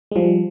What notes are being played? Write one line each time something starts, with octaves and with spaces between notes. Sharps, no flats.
G#3
F3 G3